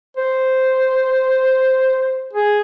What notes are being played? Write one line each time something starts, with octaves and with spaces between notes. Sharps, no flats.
C5
G#4